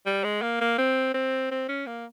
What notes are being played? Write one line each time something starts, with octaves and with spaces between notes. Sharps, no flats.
G3
G#3
A#3
A#3
C4
C4
C4
C#4
A#3